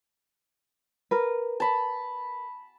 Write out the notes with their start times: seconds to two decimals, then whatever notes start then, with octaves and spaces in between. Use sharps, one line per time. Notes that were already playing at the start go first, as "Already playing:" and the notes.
1.11 A#4 B4
1.60 A5 B5